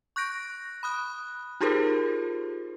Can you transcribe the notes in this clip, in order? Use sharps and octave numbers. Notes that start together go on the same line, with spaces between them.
C#6 F#6 G6 A#6 D7
B5 D#6 F#6
D#4 F4 G4 G#4 A#4 C5